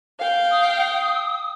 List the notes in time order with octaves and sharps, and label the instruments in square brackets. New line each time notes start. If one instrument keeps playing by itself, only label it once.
[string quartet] F5 G5
[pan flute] D#6